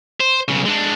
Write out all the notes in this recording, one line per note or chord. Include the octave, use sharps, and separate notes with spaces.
C5
B1 C#3
G#3 D4